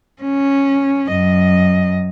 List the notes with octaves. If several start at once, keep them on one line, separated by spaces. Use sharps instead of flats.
C#4
F#2 D#5